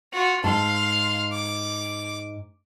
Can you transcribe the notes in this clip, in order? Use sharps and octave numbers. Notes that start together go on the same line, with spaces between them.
F4 F#4
G#2 F5 A5 C6
D6